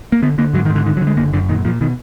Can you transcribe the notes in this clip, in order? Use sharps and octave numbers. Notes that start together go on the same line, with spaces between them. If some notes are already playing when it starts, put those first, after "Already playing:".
A#3
D3 B3
D3 A#3
G#2 F#3
D#3
G#2
D3
D3 D#3
F#3
D3
G#3
F#1 A#3
F#2 D3
A#2 D#3
A#2 F3
B2 D#3